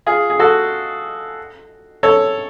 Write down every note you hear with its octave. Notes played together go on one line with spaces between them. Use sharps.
F4 G#4
G#4
F#4 A4
A4 C#5